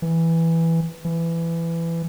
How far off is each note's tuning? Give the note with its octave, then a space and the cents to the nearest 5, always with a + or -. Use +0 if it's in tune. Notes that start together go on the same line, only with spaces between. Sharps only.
E3 +0
E3 +20